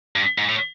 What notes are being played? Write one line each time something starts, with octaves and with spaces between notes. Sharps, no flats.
G2
G#2
A2